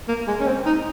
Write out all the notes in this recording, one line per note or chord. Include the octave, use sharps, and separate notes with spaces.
A#3
G#3
C#4
C4
D#4